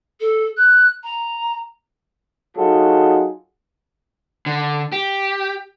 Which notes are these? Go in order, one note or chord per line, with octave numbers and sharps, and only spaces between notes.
A4
F#6
A#5
F#3 D#4 F4 F#4 G#4 A4
D3
G4